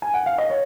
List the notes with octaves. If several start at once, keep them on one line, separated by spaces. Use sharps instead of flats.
G#5
F#5
F5
D#5
C#5